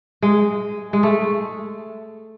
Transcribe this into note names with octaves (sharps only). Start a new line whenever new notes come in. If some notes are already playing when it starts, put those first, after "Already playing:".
G#3
G#3
A3